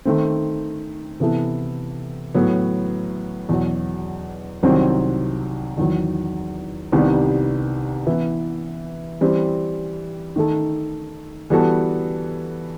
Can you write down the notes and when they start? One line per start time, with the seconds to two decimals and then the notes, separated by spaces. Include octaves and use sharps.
0.05 D#3 A3 C4
1.20 C3 E3 B3 E4 A4
2.35 A2 F#3 B3
3.49 E2 B2 F#3
4.63 C2 C3 D#3 F#3 C4
5.78 E2 D#3 F#3
6.92 C2 C3 D#3 G3 B3
8.07 E3 B3 E4 B4 E5
9.21 E3 G3 C4
10.36 D#3 A3 D#4 A4
11.50 E3 G3 B3 F#4 A4